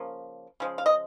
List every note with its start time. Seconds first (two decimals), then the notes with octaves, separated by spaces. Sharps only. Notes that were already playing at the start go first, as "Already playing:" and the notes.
Already playing: C#3 F3 A#3
0.60 C#3 F3 G#3
0.78 F5
0.86 D#5